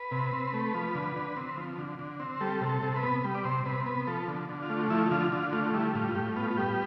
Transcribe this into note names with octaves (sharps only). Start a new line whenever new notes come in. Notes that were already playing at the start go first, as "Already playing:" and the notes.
Already playing: B4
C3
C4
A3
F3
D3
D3
C4
F3
D3
D3
C4
G3 A4
C3
A4
C3
B4
B3
G3
D5
C3 C5
C3 B4
B3 B4
F3 A4
D3
D3
F4
A3
F3 E4
D3 F4
D3 F4
A3 F4
G3 E4
A2 F4
F4
A2 G4
B3 F4
F4
G3 G4